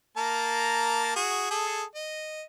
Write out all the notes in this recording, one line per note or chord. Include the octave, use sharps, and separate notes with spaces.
A#3 A5 A#5
F#4 G#4
G#4 A4
D#5